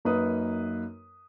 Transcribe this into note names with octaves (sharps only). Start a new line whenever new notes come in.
F#2 A#3 D#4 B4 D#6